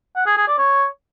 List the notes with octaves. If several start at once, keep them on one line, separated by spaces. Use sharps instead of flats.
F#5
G#4
G#4
D5
C#5